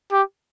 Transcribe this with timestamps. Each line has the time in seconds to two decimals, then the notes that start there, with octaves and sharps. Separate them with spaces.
0.12 G4